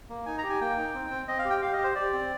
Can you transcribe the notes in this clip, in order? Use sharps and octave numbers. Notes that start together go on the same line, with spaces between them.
A#3
D#4 G#5
A#5
G4
G#5
A#3 G5
D#4
C4
C4
C4 D#5
F5
G4
G5
G4 F5
D#5
G4
C5
G4 D5
C4